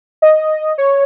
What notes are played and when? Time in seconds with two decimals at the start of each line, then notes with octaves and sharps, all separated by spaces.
0.22 D#5
0.78 C#5